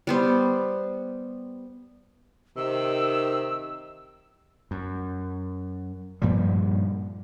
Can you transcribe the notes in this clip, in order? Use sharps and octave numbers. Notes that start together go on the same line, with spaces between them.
G3 B3 C5
C3 D#3 E6
F#2
G2 A#2 F3 G3